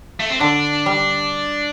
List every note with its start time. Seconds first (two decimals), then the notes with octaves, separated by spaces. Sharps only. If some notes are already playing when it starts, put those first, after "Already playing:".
0.20 A3
0.30 C4
0.40 D3 D4
0.86 G3